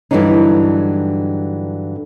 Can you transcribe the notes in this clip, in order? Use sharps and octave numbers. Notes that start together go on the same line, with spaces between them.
G2 D3 E3 F#3 D4 D#4